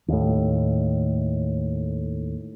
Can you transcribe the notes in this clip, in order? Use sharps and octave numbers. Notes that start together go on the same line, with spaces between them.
D#2 A2